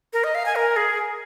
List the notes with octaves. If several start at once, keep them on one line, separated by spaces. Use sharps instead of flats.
A#4
D#5
F5
G#5
A#4
G#4